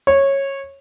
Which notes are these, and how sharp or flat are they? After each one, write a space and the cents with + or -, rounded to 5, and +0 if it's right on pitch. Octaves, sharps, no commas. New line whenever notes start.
C#5 -15